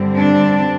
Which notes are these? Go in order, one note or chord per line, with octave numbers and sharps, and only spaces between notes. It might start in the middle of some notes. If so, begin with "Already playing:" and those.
Already playing: G2 D3 G3 C4
D4